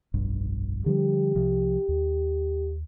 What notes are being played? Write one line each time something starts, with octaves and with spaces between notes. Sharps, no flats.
F1 B1 G2
D3 F3 G3 G4
C2 C3 F3
D#2